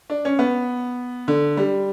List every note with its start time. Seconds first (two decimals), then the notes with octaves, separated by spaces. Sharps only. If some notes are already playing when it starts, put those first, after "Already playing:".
0.10 D4
0.25 C#4
0.39 B3
1.28 D3
1.57 G3